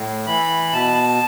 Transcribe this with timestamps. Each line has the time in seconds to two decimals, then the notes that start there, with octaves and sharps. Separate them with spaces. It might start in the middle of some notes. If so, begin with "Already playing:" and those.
Already playing: A2
0.27 E3 B5
0.69 B5
0.73 B2 A5